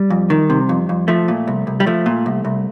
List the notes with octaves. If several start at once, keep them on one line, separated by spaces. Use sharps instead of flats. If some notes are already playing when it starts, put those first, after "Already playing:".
Already playing: G3
F2
D#3
C3
F2
F2
F3 A3
A#2
C2
C2
G3
F3 A3
A#2
C2
C2